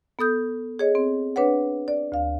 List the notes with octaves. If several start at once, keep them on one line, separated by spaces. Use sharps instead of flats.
B3 A4 D#6 G6
G#4 C#5 D#5
C4
D4 B4 C#5 F#5
D5
D2 F5